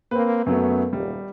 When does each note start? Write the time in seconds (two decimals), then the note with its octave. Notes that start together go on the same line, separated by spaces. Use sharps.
0.11 A#3 C4 B4
0.46 F#2 F#3 A3 B3
0.93 D#1 G3